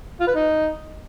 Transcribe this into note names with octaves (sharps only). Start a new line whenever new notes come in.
F4
B4
D#4